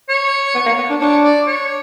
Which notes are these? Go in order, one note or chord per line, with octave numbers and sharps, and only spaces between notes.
C#5
B3
A#3
B3
D4
D4 C#5
D5
C#5